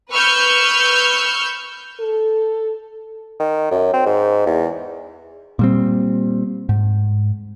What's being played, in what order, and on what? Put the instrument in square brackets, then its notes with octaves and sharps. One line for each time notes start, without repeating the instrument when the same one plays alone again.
[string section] B4 C#6 E6 F6 G6
[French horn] A4
[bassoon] D#3
F#2
C4
G#2
E2
[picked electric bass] A#2 G3 C4
G#2